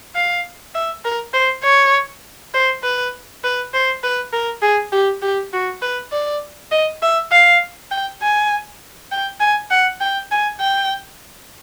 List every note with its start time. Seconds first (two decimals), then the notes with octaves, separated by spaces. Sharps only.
0.15 F5
0.75 E5
1.05 A#4
1.34 C5
1.64 C#5
2.54 C5
2.83 B4
3.44 B4
3.74 C5
4.04 B4
4.33 A#4
4.62 G#4
4.92 G4
5.22 G4
5.53 F#4
5.82 B4
6.12 D5
6.72 D#5
7.03 E5
7.32 F5
7.91 G5
8.22 G#5
9.12 G5
9.41 G#5
9.71 F#5
10.01 G5
10.31 G#5
10.61 G5